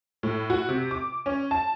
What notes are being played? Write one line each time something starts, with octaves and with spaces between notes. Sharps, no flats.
A2
F#4
C3
D6
C#4
A5